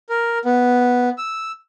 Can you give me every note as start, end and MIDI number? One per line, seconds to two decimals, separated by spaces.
0.09 0.38 70
0.45 1.10 59
1.18 1.52 88